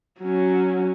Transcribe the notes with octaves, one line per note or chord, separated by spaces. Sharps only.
F#3 C#4